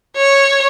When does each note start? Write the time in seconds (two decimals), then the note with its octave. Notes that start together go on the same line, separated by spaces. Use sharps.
0.17 C#5